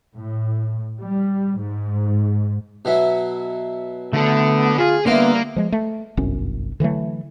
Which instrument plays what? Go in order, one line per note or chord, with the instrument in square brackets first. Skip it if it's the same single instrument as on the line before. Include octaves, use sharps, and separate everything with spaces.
[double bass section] A2
G3
G#2
[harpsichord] B2 F#3 E4
[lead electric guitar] D3 A4 [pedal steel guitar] A3 [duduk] B3
[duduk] F4 [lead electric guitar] G#4
[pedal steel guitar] D3 B3 [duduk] G3 [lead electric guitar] A#3 [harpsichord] E4 F5 C6
[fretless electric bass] F3 G#3
A3
G1 C2 F#2 C#4
D3 E3 F#3 A3